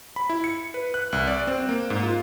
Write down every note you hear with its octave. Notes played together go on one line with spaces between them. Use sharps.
B5
E4
C#7
B4
F#6
C2
D5
C4
A#3
G#2
F4